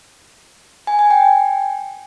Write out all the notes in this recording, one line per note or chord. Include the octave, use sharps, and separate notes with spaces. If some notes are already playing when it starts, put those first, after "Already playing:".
G#5
G#5
G5